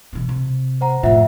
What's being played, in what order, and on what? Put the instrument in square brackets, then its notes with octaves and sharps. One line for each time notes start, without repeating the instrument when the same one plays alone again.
[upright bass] B2 E3
C3
[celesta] C5 F#5 A#5
[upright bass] F2 A2 [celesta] F4 E5 F#5